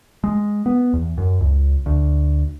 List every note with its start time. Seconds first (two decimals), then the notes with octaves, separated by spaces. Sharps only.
0.24 G#3
0.66 B3
0.93 E2
1.17 F#2
1.40 C#2
1.86 D2